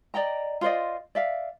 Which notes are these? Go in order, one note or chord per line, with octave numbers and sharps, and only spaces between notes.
D5 D#5 G5 A#5
F4 C5 D5 D#5
D5 E5 F5